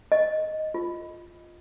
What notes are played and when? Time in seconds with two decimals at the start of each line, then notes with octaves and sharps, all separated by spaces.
0.12 D#5
0.74 F4